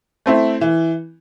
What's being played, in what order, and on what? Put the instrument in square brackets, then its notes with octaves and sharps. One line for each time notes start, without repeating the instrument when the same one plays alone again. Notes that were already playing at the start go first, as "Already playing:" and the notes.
[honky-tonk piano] A3 C4 E4
E3